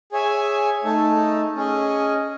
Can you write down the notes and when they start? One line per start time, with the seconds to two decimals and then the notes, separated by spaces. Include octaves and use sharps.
0.12 G#4 C#5 E5 G#5
0.84 A3 D#4 A4
1.56 C#4 G#4 D#5